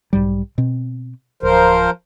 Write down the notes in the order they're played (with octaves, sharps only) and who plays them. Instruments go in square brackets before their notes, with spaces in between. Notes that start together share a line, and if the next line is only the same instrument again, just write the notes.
[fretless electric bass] B1 G#2 G3
B2 C4
[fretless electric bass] D1 [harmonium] F3 A#4 C5